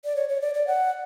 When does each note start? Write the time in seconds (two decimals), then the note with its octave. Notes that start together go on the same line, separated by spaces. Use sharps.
0.05 D5
0.16 C#5
0.29 C#5
0.41 D5
0.54 D5
0.67 F#5